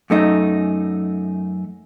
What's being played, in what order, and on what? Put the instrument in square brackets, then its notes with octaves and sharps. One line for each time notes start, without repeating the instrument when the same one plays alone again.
[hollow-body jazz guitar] F#2 A3 D#4